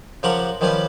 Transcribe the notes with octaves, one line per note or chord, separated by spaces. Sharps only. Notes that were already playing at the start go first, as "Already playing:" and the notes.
C#3 F3 G4 A#4 F#5 C#6
D#3 F3 G3 C#4 G4 B4